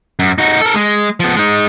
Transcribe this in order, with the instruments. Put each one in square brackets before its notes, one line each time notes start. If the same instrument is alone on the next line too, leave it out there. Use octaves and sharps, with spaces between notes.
[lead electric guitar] F#2
D#4 F#4
A4 A#4
G#3
F3 B3
G#3 D#4